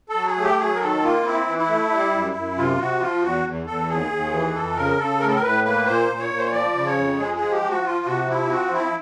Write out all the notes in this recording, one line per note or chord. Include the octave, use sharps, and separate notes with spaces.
A4
F#3
G#4
A3
G4
F#3 G#4
A#4
D#3 A4
A#3 F4
C4 E4
E3
E4
A3
G3
F#2
F#2
C3 F4
C3 F#4
F3 F4
E2 F#4
E2
E2 A4
D#2 G#4
D#2
E3
F2 A4
C#3 A#4
C#3 A4
A2 A#4
A4
A#4
A2 B4
A#3 B4
A#2 C5
A#2
C#5
A#2
C5
C#5
F3 D5
C#3
C#5
F2
G#3 G#4
F3 G#4
G4
F3
F#4
F3 F4
C3 F#4
F3 E4
C4 F#4
F3 E4